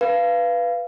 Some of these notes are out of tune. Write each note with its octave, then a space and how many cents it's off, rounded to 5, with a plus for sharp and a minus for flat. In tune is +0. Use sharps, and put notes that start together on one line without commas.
B4 +0 F5 -20